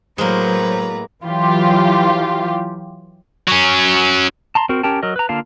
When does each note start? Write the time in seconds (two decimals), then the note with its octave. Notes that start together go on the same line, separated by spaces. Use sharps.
0.18 A2 F#3 G#3 A#3 B4 C5 A#5
1.23 E3 F#3 F4 G4
3.48 F#3 C#4
4.55 A5 A#5 C6
4.69 C4 F#4 A#4
4.83 C#4 G4 A#4 G5 A5
5.03 F#3 A#4 D#5
5.16 B4 A#5
5.29 D3 A#3 F4 F5 A5